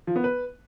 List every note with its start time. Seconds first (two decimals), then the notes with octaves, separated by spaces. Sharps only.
0.07 F3
0.16 B3
0.24 B4